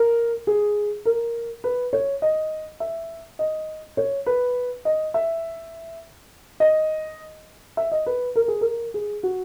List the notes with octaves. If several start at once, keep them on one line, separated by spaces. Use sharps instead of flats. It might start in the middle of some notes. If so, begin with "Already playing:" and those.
Already playing: A#4
G#4
A#4
B4
C#5
D#5
E5
D#5
C#5
B4
D#5
E5
D#5
E5
D#5
B4
A#4
G#4
A#4
G#4
F#4